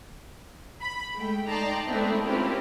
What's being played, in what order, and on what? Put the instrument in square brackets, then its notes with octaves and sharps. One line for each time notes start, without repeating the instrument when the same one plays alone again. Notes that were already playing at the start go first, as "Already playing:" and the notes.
[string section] B5
G#3 A3 G5
D#4 D5 G5 A5 A#5 C6
G#3 A3 B3 C4 D4 E4
C4 C#4 E4 F4 G4 A#4